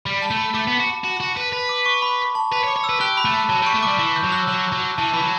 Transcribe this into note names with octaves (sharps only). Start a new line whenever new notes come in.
G3 B5
A5
A3
B5
A3 D6
B3
F#4
F#4
F#4
B4
B4 B5
D6
C#6
B5
A5
B4 B5
C#5
D6
C#5
E6
B4
G4 F#6
B5
A3
A5
F#3 A5
G3
C#6
A3
D6
G3
E3 D6
G6
F#3
F#6
E6
F#3 F#6
F#3
E3 A5
E3 B5
F#3